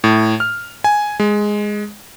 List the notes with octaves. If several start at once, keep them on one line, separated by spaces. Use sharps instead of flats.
A2
F6
G#5
G#3